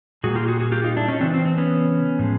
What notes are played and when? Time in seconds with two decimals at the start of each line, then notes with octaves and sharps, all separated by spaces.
0.24 A#2 G3 A#3 F#4 G#4
0.35 F4 G4
0.48 F#4 G#4
0.60 F#4 G#4
0.72 F4 G4
0.84 D#4 F4
0.97 D4 E4
1.08 C#4 D#4
1.21 C#3 E3 C4 D4
1.34 C4
1.45 C4
1.58 B3 C#4
2.19 A2 F3 G#3